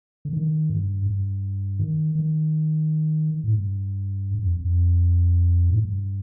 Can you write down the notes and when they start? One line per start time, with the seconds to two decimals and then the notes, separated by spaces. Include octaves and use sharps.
0.25 D3
0.33 D#3
0.69 G2
1.06 G2
1.79 D#3
2.15 D#3
3.44 A2
3.53 G2
4.35 G2
4.43 F2
4.61 F2
5.70 A2
5.81 G2